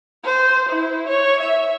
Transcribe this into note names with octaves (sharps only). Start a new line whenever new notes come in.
C5
E4
C#5
E5